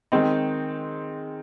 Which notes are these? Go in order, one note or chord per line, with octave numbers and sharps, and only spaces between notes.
D#3 G#3 C4 D#4